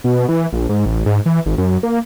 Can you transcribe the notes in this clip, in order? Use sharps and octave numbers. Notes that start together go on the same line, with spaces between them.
B2
E3
A#1
G#2
A1
G#2
E3
G#1
F#2
A#3